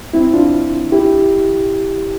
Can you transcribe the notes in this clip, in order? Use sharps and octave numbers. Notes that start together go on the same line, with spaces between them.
C4 E4
D4 F4
E4 G4